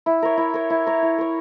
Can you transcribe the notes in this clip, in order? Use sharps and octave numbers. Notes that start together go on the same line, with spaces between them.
E4
A#4 C#5
E4
A#4 C#5
E4
A#4 C#5
E4
A#4 C#5